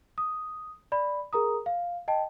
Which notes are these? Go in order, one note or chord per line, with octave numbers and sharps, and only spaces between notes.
D#6
D5 B5
G#4 A#4 A#5 D#6
F5
D#5 G5 A5